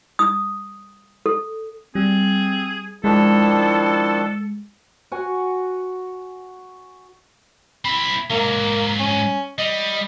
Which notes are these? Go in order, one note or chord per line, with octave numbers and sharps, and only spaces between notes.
D#6
A4
G3 C4 G#4
D#3 F3 G#3 D4 E4 A4
F#4 F#5 G#5
C4 E4 B5
G#2 F#3 A#3
C#4
G3 D#5